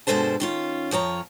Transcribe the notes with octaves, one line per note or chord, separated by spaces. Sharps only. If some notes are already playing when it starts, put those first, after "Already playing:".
G2 B2 G#3 A4 C5 A5
D#3 C#4 F4
F2 F3 C#5 A#5